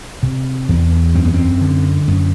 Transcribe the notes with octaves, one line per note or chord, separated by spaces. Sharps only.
C3
E2
F#2 C4
B3
C4
D3
F#2